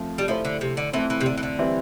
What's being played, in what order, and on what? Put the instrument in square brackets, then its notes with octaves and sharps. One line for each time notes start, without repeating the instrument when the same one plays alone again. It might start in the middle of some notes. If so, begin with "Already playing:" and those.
Already playing: [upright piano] F3 A3 C4
[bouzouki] G3
[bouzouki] F3 [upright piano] A3 E4 A4 C5
[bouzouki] D3
C3
D3
[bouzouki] E3 [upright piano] A3 C4 E4
[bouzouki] E3
C3
D3
E3
D3
[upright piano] E3 G3 C4 E4